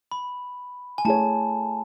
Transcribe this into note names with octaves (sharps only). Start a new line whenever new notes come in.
B5
G#5
A3 E4 G#4 C#5 A5